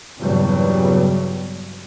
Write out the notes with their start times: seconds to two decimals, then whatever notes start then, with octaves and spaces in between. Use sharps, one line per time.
0.19 E2 G2 A#2 C#3 F#3 G3